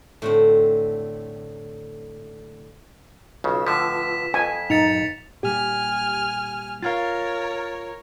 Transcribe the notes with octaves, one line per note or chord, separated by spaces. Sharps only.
A2 D3 C4
B1 C#3 F4 B4 E6
A2 D3 F3 B6 E7
F2 G#5
G2 A#2 F#3 D#4 A6 C#7 F7
A#2 G3 G4 G#5 F6
F4 A#4 C#5 F5 F6 G#6 A6